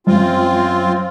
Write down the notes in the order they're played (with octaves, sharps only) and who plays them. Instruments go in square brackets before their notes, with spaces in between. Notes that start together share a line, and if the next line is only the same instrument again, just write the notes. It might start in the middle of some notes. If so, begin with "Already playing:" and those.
[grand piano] F#2 [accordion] C4 F4